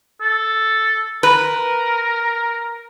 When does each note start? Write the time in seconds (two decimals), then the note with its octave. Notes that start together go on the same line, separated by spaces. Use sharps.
0.21 A4
1.23 A#4 B4